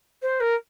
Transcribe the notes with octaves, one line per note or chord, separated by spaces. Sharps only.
C5
A#4